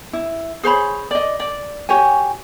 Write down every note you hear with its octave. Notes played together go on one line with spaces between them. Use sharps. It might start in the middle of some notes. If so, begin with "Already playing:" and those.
E4
G#4 C5 C#5 B5
D5 D#5
D5
F#4 G4 C#5 G#5